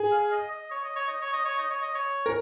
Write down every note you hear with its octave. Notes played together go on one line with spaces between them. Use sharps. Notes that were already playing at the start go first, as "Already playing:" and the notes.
Already playing: G#4
F5
D#5
D#5
C#5
D#5
C#5
D#5
C#5
D#5
C#5
D#5
C#5
D#5
C#5
A#4